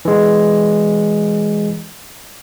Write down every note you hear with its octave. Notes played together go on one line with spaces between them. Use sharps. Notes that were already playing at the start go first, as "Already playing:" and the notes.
E3 G#3